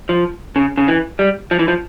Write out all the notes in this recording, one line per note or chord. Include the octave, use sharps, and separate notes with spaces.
F3
C#3
C#3
E3
G3
F3
E3
F3